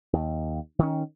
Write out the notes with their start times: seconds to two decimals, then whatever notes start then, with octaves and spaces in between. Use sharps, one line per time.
0.13 D#2
0.79 D#3 C#4